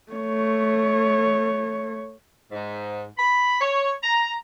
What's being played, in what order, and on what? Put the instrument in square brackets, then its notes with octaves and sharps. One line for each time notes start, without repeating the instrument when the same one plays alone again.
[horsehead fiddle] A3 C#5
[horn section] G#2
B5
C#5
A#5